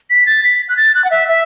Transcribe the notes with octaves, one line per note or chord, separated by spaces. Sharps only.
B6
A6
B6
F#6
A6
F#6
F#5
E5
E5